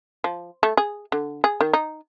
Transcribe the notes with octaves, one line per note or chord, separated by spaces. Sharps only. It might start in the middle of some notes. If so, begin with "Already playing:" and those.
F3
A3
G#4
D3
G#4
D#3
D#4